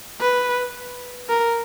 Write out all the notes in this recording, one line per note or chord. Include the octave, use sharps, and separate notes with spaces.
B4
A#4